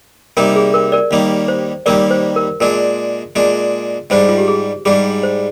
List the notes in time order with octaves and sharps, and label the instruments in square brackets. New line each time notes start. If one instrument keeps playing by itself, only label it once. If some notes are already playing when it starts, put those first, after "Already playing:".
[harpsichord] C3 G3 A#3 D#4 [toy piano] A#4
[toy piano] G#4
A#4
A#4 D5
[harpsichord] D#2 D#3 G3 A#3
[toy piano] C5
[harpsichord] D#2 D#3 G3 A#3 [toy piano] A#4 D5
[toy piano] C5
A#4
[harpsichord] A#2 G#3 D4 [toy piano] A#4 D5
[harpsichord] A#2 G#3 D4
[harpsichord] G#2 G3 D4 [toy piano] C5
[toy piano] F4
G4
G#4
[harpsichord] G#2 G3 D4 [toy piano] G#4
[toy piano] C5